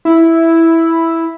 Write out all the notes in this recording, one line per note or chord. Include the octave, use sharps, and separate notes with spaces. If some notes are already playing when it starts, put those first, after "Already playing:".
E4